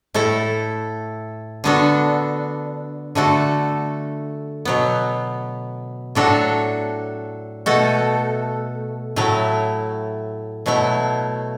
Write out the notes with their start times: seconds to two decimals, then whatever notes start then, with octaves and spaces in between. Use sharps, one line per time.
0.14 A2 A3 E4 A4
1.64 D3 B3 D4 F#4 A4
3.15 D3 A3 F#4 A4
4.65 B2 F#3 B3
6.15 A2 F#3 D4 F#4 A4
7.66 B2 A3 F#4 A4
9.16 A2 F#3 A3 E4
10.66 B2 F#3 A3 E4